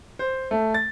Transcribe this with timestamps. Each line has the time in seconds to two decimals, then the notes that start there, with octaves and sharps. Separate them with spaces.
0.19 C5
0.51 A3
0.74 A6